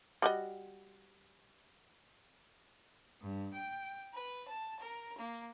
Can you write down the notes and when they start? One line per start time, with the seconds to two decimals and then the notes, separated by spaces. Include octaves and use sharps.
0.22 G3 F#4 D#5
3.21 G2
3.53 G5
4.13 B4
4.47 A5
4.79 A#4
5.17 A#3